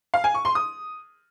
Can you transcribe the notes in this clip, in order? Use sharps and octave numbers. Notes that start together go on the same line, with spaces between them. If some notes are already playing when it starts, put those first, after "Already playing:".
F5
G#5
C#6
C6
D#6